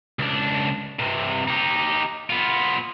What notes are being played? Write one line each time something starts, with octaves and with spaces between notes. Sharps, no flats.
C#2 D4
G2 C3
D#4 G4
B3 F4